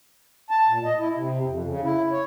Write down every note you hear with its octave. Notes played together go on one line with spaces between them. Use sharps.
A5
A#2
D#5
E4
C3
F2
C#3
E4
C#5